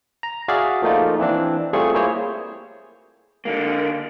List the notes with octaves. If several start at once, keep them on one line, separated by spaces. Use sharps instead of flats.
A#5
F#4 G#4 D5 E5 F5
F3 A3 A#3 D#4 F4
E3 C4 D4
G3 A3 C4 F4 G#4 C#6
A#3 E4 G#4 C5 C#5
D3 A#3